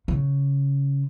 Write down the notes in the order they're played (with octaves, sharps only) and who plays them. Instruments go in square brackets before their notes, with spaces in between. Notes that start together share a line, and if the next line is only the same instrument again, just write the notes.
[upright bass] C#3